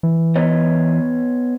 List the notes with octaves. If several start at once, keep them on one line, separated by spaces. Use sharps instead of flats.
E3
B3 C#5 D#5